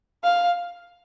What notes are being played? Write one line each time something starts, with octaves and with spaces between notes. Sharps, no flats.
F5